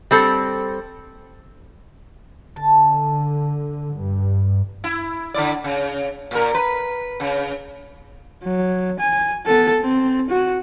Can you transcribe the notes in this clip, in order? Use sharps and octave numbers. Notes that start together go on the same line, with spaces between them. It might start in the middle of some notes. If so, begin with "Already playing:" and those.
G3 C4 A4
D3 A5
G2
E4
D3 E4 D5
C#3
A#2 A#4
B4
C#3
F#3
G#5
B3 A4
C4
F#4